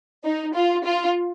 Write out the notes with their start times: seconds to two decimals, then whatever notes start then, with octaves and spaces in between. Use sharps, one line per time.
0.24 D#4
0.55 F4
0.85 F4